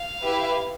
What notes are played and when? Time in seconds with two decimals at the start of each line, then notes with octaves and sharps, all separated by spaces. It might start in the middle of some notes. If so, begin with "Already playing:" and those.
Already playing: F5
0.22 E4 G4 B4 E5